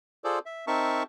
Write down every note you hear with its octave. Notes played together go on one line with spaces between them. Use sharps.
F4 G#4 A4 C5 D5
E5
C4 D#4 A#4 E5 A5 C#6